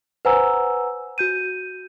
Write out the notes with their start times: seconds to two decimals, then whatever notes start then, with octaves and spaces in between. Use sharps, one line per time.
0.25 B4 C5 F#5 G#5 A#5 E6
1.18 F#4 G6 D#7